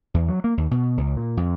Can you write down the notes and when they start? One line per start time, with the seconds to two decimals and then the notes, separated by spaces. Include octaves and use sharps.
0.14 E2
0.29 F#3
0.44 A#3
0.57 D#2
0.71 B2
0.97 C#2
1.16 A#2
1.37 F2